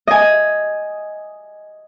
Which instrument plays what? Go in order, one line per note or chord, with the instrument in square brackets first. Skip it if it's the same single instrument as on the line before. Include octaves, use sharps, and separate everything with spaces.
[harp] D#5 G#5